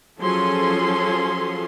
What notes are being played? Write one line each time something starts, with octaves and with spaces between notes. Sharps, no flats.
F3 F#3 C#4 G#4 A4 C6